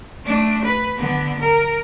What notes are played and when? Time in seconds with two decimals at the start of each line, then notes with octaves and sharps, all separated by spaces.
0.24 A3 D4
0.64 B4
0.97 D3 B3
1.40 A#4